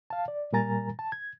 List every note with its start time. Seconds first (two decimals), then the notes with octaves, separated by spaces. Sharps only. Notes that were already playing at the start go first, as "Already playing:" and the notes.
0.10 F5 A5
0.28 D5
0.52 A#2 G3 A#4 G#5 A#5 A6
0.99 A5
1.12 G#6